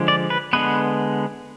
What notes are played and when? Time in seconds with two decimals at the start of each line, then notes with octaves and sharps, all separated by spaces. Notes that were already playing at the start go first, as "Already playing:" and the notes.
Already playing: D3 F3 G#3
0.08 D5
0.30 B4
0.53 D3 G#3 B3 B4